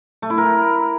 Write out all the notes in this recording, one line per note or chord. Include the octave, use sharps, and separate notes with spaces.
A3
E4
A#4